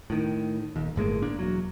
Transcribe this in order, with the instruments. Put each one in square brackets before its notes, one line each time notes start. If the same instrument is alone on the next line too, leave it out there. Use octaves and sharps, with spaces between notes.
[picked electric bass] A2 D#3
D#1 D#2
G1 A2 G#3 A#3
A#3 D4
E1 F#3